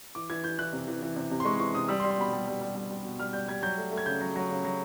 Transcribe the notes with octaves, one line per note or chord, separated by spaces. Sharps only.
E3 D6
E3 G#6
E3 G6
E3 F#6
C3
E3
E3
C3
C3
C6
G#3 C#6
C6
E3 C#6
C3 D#6
G3 E6
C6
G3
C6
B2 B5
G3
G3
G3
G3
G3
B2
G3 F6
G3 G6
G3 G#6
F#3 G6
A3
A3
G#6
C#3 G6
F#3
F#3
C#3
F#3